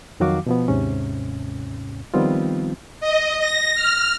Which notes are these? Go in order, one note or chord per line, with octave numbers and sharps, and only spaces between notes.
F2 D#3 F#3 F#4 F5 D6
B2 F3 B3
D#2 G#2 C3 C#4
D#3 F3 G3 B3 C4 F4
D#5
A#6
F6